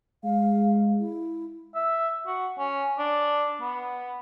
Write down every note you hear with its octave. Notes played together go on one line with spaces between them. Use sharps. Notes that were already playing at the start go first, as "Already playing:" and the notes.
G#3 F5
E4
E5
F#4
C#4
D4
B3